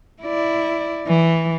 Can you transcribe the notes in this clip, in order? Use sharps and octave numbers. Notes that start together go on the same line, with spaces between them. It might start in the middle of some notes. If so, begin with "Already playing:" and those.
E4 D5
E3